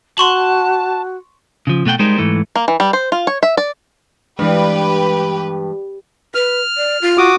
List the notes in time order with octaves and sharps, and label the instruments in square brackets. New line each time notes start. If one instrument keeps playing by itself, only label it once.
[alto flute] F#4 [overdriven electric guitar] A5 [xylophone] C6 C#6 F#7
[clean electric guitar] C#3 F3
B2 A3 F#5 G5
G3 G#3 D#4 A#4 C5
G#2 E3 A3
[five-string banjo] A#3
E3
G3
C5
F4
C#5
E5
D5
[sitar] G2 [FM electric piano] E3 G#3 [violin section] G4 B4
[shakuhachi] B4 [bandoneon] F6
[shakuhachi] D5
F4
[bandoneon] F#4 D6 D#6